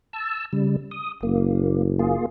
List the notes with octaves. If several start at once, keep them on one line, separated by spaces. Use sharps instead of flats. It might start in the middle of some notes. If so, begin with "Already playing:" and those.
A5 E6
C#3 G3
D#6
F#1 A#3
A#3 F4 G#4